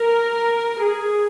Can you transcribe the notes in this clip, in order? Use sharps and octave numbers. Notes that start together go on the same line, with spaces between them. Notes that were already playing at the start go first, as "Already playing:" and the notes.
Already playing: A#4
G#4